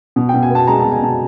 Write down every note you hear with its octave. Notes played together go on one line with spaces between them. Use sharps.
B2
G5
B2
G#5
B3 A5
G#3 A#5
B2 A5
G#5
B2 A5